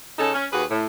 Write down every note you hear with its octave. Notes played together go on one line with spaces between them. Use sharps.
C#3 C#4 D#4 A4
C#4
D#2 F#4 G#4 B4
A2